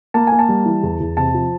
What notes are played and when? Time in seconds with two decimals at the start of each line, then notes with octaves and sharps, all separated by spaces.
0.14 A#3 A5
0.27 A#3 G#5
0.39 A5
0.49 G3
0.66 E3
0.83 E2
1.00 E2
1.17 C3 A5
1.34 F3